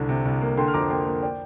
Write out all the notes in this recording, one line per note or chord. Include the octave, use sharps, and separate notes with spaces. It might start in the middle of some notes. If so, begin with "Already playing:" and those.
Already playing: C2 D3
C3
C2
A#3
D3 G5 C6
F6
F2 A#5 D6
A#3 G5 C6
A#3
D5 G5